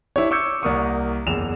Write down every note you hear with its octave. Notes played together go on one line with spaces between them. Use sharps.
D4 E4 G4 C#5
C#6 D6 E6 G6 G#6 C#7
C2 A#3 A#4 F#5 C#6 D#6
F#1 E2 E7 F7